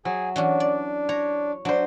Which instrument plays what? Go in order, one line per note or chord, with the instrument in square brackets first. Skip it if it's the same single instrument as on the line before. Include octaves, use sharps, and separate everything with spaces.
[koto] F#3 [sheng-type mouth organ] G#4 G#5
[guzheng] E3 C#4 F#4 [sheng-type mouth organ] D4
[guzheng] D5
[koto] C#5 [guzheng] A#5
[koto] F#3 C5 [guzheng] D4